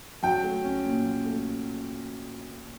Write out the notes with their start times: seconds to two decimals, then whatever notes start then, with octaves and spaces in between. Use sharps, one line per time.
0.23 F#3 G5
0.44 A3
0.64 C#4
0.85 A#2
1.04 F#3
1.25 A3